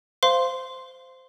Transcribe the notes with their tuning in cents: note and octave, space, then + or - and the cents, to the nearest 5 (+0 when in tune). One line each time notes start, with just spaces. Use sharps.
C5 -15 F5 -15 C6 +0